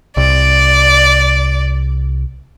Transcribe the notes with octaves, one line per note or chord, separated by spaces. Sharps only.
C2 D5